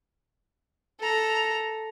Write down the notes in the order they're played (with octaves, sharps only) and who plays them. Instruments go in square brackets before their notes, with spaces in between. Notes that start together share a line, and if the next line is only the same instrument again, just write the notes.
[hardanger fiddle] A4 A#5